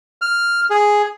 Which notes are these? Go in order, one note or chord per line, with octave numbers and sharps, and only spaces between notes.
F6
G#4